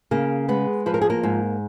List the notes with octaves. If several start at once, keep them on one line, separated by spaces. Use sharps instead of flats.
C#3 A#3 A#4
G#3 B3 B4
F3 B4
A#4
G#4
A#3 A#4
G#2